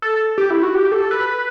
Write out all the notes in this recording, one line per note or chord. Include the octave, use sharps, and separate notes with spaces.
A4
G4
E4
F#4
G4
A4
B4